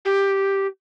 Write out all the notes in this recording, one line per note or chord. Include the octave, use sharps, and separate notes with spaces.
G4